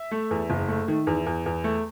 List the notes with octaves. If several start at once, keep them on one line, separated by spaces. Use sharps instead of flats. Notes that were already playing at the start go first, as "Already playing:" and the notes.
Already playing: E5
A3
E2
F#1
A3
D#3
E2
E2
E2
A3